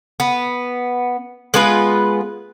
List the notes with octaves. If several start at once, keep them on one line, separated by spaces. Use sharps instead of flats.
B3
G#3 B3 F4 B4